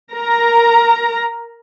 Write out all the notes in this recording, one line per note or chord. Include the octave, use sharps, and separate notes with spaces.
A#4 A#5